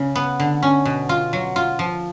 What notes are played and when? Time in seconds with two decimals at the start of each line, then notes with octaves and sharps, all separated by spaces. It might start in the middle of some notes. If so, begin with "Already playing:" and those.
Already playing: C#3
0.16 B3
0.40 D3
0.63 C#4
0.85 B2
1.09 F4
1.33 F#3
1.56 F4
1.79 F3